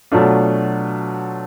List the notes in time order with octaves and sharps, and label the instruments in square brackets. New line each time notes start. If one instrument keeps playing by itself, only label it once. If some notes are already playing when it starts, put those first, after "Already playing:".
[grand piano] B2 F#3 A3 D4 F4